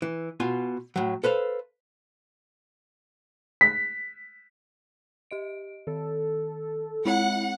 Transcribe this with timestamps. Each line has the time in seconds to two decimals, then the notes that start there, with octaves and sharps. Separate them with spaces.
0.02 E3
0.40 B2 F4 G#5
0.96 A2 F#3
1.24 A4 B4 C5 F5
3.61 B6
5.31 G4 D#5 D7
5.87 D#3 A4
7.05 G#3 C4 E4 C#5 F#5